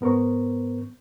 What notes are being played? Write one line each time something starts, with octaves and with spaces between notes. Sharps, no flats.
G#2 B3 A#4 C5 C#6